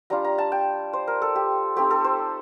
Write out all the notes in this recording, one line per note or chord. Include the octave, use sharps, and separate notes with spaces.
G3 D4 F4 A#5
A#5
A5
G5
C5
A#4
A4
G4
A3 C4 D#4 G4
A4
C5